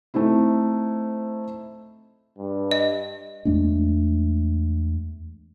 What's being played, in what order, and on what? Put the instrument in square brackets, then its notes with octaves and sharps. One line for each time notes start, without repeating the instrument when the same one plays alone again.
[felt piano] A3 C4 D#4 E4
[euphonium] G2
[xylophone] D#5
[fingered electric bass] E2 G#3 A3 D4